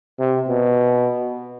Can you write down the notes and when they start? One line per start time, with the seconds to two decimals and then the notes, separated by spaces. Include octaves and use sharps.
0.19 C3
0.48 B2